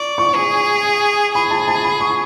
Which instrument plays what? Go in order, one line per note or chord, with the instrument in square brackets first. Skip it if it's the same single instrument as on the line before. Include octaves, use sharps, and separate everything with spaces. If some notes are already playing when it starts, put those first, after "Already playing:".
Already playing: [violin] D5 [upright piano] C#6
[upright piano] C#6
[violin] G#4
[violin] G#4 [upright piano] B5
[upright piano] A5
A5
B5
C#6